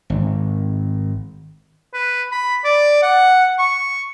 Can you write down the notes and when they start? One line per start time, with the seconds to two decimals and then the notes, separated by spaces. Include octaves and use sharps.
0.10 G#1
1.94 B4
2.32 B5
2.65 D5
3.03 F#5
3.59 C#6